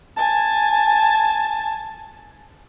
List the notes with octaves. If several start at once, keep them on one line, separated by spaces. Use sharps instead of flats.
G#5 A5